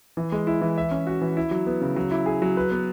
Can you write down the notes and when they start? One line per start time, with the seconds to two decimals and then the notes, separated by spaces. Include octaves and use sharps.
0.17 E3
0.32 G#3
0.47 E4
0.61 E3
0.78 E5
0.91 C#4
1.07 F#4
1.21 E3
1.37 E4
1.51 F#3
1.67 B3
1.81 C#3
1.96 F#3
2.11 E4
2.26 G#4
2.42 F#3
2.57 B4
2.71 B3